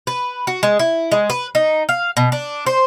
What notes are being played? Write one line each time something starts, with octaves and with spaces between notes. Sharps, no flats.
B4
F#4
G#3
E4
G#3
B4
D#4
F5
B2
D4
C5